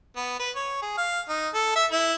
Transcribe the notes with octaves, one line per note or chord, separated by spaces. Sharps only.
B3
B4
C#5
G#4
F5
D#4
A4
E5
E4